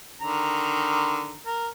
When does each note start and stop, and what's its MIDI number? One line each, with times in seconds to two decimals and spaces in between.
0.21 1.39 50
0.21 1.39 51
0.21 1.39 82
1.46 1.68 70